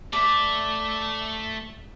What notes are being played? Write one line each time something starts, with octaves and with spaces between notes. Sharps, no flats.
A3 D5 E5